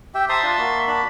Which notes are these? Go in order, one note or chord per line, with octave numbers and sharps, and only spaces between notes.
G4 E5 G5
C5 E5 A5 A#5 C6 D#6
D4 F4
A#3 F#4
D4 A5 B5